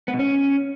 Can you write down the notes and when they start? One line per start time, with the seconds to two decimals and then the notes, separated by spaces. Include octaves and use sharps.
0.08 B3
0.14 B2
0.19 C#4